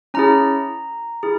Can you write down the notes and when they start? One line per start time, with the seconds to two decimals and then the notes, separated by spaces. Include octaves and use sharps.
0.14 C#4 E4 G#4 A#5
1.23 E4 G#4